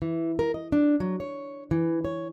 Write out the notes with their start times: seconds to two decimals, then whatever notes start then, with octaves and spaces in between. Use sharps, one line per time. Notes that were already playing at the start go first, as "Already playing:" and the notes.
0.02 E3
0.39 A#4
0.54 D#5
0.72 D4
1.00 F#3
1.20 C#5
1.71 E3
2.05 C#5